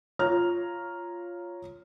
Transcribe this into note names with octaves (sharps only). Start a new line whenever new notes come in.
F4 C#5 A#5 F6